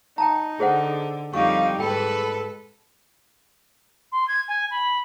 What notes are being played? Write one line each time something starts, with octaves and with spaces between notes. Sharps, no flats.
D#4 G5 A5 A#5
D3 G#4 C5 F#5
F2 G3 D#4 G4 F5 C#6
G#2 A4 B4 G5 B5
C6
G#6
G#5
B5